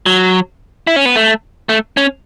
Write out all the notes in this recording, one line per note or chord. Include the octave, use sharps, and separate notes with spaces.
F#3
E4
C#4
B3
A3
A3
C#4